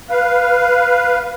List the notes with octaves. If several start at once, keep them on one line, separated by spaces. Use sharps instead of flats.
B4 F5